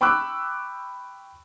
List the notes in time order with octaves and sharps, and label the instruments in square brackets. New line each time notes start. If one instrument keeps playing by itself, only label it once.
[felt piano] G5 B5 C#6 D6 E6 F#6